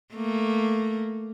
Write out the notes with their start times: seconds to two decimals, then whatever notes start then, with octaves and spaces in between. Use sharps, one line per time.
0.14 A3 A#3